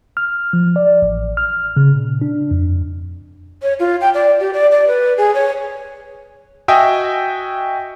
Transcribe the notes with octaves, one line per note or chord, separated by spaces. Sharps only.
F6
F3
D5
A1
F6
C#3
A#2
D4
F2
C#5
F4
G5
D5
G4
D5
D5
B4
G#4
C#5
F#4 D#5 E5 G5 G#5 D#6